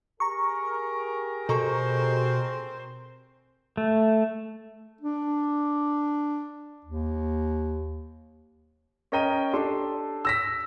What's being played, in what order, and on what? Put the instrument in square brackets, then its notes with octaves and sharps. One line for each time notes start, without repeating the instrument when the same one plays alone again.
[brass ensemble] G4 G#4 A#4 [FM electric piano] A#5 C#6
[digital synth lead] B2 [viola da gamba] C4 C5 [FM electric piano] A4 A#5 C#6
[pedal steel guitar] A3
[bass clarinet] D4
D#2
[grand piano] C#4 A#4 D#5 G5 A#5 D#7
D4 G4 A4 C6
E6 A#6 B6